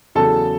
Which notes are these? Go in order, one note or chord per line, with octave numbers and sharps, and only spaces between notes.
E2 C#3 F#3 A4 A5